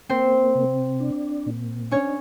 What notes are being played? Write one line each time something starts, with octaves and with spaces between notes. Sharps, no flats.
A#3 C4 C5
C3
D4
A#2
C#4 D4 C#5